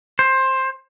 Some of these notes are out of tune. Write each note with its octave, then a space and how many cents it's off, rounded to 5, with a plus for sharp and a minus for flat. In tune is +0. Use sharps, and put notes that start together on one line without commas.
C5 +15